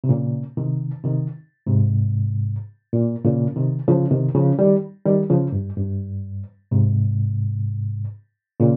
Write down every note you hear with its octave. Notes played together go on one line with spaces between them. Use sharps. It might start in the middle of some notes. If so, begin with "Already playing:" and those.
C3
A#2 C#3
C3 D#3
C3 D#3
G#2 C3
A#2
A#2 C#3
C3 D#3
C#3 F3
C3 D#3
C#3 F3
D#3 G3
D#3 G3
C#3 F3
G2
G2
G#2 C3
A#2 C#3